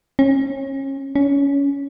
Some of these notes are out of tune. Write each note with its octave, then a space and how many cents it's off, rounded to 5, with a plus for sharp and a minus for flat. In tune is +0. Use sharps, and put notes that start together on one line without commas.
C#4 -30
C#4 +20